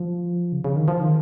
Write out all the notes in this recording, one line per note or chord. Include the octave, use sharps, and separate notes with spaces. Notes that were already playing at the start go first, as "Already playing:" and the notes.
Already playing: F3
C#3
C#3
D#3
F3
D#3